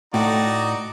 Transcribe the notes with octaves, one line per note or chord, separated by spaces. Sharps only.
A2 D#4 F#4 D5